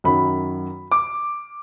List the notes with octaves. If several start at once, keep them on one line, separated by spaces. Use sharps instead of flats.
F#2 D#3 F#3 B5
D6